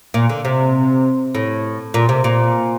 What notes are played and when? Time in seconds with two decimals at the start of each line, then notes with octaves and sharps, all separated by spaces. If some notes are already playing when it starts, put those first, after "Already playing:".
0.14 A#2
0.29 D3
0.45 C3
1.35 A2
1.94 A#2
2.09 C3
2.24 A#2